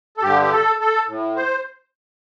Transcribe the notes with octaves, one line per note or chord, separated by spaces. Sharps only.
A4
G2 D3 G4
G4
A4
A4
A2
C5